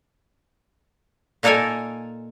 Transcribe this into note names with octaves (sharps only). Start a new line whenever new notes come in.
A#2 A#3 D#4 A4 A#4 G#5